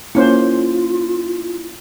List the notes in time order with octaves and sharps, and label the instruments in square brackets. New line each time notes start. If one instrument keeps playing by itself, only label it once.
[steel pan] A#3 C#4 C5 [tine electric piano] E4 [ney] F4